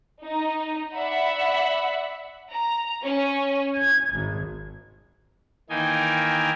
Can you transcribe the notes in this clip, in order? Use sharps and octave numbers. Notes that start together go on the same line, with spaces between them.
D#4
D5 E5 F#5 B5
A#5
C#4
G#6
G#1
D#3 E3 A#3 D#4 G5 G#5